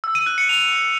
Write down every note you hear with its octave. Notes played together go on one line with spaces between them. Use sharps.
E6
D#7
F#6
C#7
F7